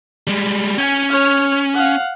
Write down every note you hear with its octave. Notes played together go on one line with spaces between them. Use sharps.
G3 G#3
C#4 G#5
C#5 F6
F5 F#5